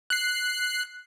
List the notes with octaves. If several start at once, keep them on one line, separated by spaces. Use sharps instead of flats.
F#6 C7